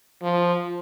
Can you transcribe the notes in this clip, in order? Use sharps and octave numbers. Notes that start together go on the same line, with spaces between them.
F3